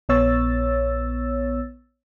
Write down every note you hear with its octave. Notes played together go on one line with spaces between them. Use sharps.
A#1 B3 C#5 E6 A6